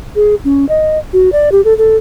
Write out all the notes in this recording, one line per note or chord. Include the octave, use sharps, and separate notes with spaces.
G#4
C#4
D#5
F#4
D5
G4
A4
A4